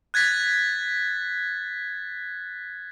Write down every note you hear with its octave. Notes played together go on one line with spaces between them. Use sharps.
F#6 G#6 A6 B6